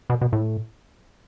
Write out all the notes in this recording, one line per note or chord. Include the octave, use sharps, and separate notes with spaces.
B2
B2
A2